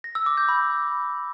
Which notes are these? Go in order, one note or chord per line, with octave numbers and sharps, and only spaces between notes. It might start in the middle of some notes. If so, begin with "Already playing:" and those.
A#6
E6
D6
G6
B5